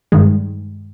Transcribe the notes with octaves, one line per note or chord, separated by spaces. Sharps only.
G2 D#3 G#3